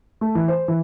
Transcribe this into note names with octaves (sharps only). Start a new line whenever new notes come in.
A3
E3
C5
E3